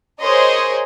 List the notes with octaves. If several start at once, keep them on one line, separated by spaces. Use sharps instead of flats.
G#4 A#4 C5 C#5 D#5